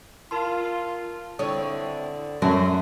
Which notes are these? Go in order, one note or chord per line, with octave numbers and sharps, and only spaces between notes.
F4 A#4 A5 C6
D3 C4 E4 C#5 D#6
F#2 F#3 A3 A#4 E5 A5 C6